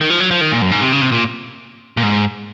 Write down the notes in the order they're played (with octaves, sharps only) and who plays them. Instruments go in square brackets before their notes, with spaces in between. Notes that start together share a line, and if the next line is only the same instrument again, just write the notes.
[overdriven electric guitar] D#3
F3
F#3
F3
D#3
A#2
F#2
G#2
C3
C#3
C3
A#2
A#2
G#2